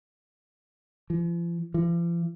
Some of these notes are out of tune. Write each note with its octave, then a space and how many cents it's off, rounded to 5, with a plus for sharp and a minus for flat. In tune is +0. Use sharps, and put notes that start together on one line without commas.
F3 -45
F3 -45